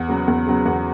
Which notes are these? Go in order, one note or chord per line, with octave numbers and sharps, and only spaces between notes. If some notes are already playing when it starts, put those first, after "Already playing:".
Already playing: E2 F#5
C#3 F#3 B3
E2
C#3 F#3 B3
E2 F#5